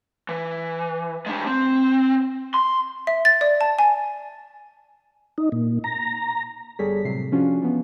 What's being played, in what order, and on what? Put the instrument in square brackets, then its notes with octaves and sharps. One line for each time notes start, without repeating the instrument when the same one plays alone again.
[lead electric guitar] E3
G#3 D4
C4
C6
[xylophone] E5
A6
D5
A5
G#5
[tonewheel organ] D#4
A#2
A#5
[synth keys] G1 G3 G#4 A4 C#5 B6
A2 C3 F#3 C7
F3 C#4 D4 F4 F#4
E3 F3 B3 C#4